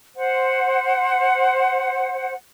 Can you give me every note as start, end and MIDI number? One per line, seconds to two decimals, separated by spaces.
0.15 2.35 72
0.15 2.35 78